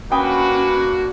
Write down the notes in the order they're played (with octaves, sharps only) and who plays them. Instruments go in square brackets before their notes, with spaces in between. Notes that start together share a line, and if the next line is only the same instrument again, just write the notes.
[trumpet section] A#3 D4 F#4 [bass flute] C#4 [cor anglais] B4 [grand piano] G5 B5 D#6